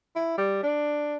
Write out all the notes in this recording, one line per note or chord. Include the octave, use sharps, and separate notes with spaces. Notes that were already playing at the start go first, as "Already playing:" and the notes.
E4
G3
D4